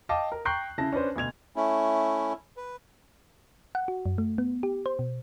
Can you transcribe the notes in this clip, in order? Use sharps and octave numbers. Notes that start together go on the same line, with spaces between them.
D#5 F5 G5 A5 D6
A#4
G5 A#5 C#6 F#6 G6 C7
C#3 E4 A5 A#6
C#4 D4 B4 C5
D2 B2 G#6 F7
A3 C#4 E4
B4
F#5
F#4
F#2
A3
B3
G4
C5
B2